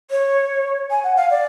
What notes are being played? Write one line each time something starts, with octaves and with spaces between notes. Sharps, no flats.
C#5
G#5
F#5
F5
D5